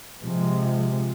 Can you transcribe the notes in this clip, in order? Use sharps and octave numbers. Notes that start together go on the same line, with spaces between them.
C3 F3 G#3